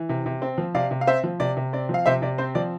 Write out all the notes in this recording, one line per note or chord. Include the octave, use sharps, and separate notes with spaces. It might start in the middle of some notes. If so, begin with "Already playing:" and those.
Already playing: E3
C3
C3
C4
F3
C3 D5 F5
C3
F5
C4 C5 E5
F3
C3 D5
C3
C4 D5
F3
F5
C3 C5 E5
C3 D5
C4 C5
F3 D5